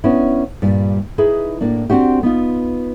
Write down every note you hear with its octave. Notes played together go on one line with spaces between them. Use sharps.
B3 C#4 D4 E4
G2 A#2 G3
D#4 E4 G#4 B4
A2 A#3 D4
C4 D4 F#4 G4
B3 D#4 F4